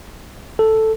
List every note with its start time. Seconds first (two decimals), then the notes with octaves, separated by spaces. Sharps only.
0.59 A4